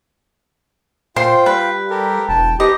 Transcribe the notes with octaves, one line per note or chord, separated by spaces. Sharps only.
A#2 F4 C5 G5 C6
G3 B4
G4 A4 A#4
E1 G5 A5
D#4 G4 B4 D#5